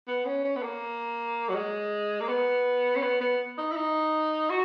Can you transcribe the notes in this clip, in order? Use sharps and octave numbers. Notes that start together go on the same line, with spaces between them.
B3
C#4
C#4
B3
A#3
F#3
G#3
A#3
B3
C#4
B3
B3
D#4
E4
D#4
F#4